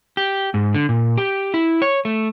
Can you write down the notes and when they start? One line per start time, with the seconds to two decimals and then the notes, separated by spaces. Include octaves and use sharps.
0.17 G4
0.54 G#2
0.74 D3
0.89 A#2
1.17 G4
1.54 E4
1.82 C#5
2.05 A3